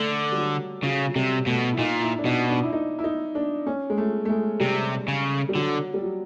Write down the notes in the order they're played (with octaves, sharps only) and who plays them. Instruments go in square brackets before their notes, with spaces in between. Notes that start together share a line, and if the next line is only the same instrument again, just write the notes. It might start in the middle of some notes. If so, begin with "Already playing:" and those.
Already playing: [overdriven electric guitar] D3 [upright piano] A3
[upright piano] G3
F#3
[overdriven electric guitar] C#3 [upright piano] F#3
[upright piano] F#3
[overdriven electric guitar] C3 [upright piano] G3
[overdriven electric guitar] B2 [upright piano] A3
[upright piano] E4
[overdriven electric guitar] A#2 [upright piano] D#4
[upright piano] E4
D4
[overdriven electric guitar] B2 [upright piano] D#4
[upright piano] D4
E4
D#4
E4
D#4
D4
C#4
G#3
A3
A3
G#3
[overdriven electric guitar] C3 [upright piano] G3
[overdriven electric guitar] C#3
[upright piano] G3
[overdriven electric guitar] D3 [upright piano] F#3
[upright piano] G3
F#3